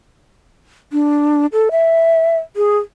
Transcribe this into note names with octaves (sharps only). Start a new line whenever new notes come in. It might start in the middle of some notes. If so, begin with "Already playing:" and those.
D4
A4
E5
G#4